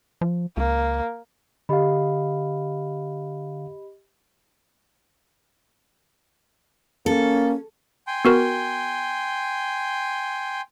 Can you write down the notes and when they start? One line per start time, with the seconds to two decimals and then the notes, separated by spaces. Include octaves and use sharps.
0.21 F3
0.57 C#2 A#3
1.69 D3 G4 D#5 F5 B5
7.06 A#3 C#4 A4
8.07 G5 G#5 C6
8.25 B3 F#4 A#4